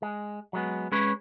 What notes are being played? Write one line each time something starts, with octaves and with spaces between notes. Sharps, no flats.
G#3
F#3 G#3 B3
G#3 C#4 B4 C#5